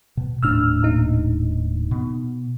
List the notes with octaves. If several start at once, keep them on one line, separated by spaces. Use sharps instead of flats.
B2
D#1 A2 D4 E6 F6
A#2 D#4
B2